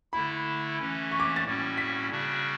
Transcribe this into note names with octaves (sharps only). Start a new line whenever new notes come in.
D3 A3 E4 B5
E3 A3 C#4
C#6
D6
A6
A2 G3 C#4 F#4
B6
C#3 G3 D4 F#4